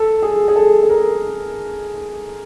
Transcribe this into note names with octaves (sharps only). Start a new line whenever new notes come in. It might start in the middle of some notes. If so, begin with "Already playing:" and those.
Already playing: A4
G#4
G#4
A4
A4
A#4